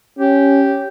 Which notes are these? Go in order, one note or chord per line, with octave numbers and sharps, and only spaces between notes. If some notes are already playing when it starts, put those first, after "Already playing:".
C#4 G4